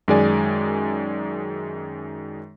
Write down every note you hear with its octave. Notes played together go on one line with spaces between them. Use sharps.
F#2 D#3 G#3 G#4 D5 G#5